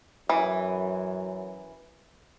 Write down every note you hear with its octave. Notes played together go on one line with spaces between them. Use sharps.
F#2 E3